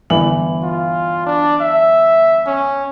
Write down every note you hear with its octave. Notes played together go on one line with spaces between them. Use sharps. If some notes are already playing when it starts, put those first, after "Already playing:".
G1 E3 F#7
F4
D4
E5
C#4